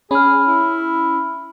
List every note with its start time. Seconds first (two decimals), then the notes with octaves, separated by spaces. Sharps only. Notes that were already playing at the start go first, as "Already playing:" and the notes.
0.11 C#4 G#4 B5 F6
0.47 E4